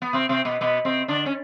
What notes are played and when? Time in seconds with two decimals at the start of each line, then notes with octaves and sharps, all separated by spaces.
0.02 B3
0.13 C3 C4
0.29 C3 C4
0.45 B2 B3
0.61 B2 B3
0.85 C3 C4
1.08 D3 D4
1.26 C#4